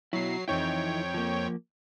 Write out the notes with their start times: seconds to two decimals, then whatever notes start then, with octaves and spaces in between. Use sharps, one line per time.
0.13 B2 F#3 E4 C7
0.48 F2 E3 D#4 E4 C#5 G5
1.14 F3 A#3